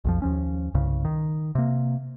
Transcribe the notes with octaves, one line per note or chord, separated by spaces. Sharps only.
B1 F2 F3
D#2 F3 C#4
C2 G2 C#3
D#3
C3 A#3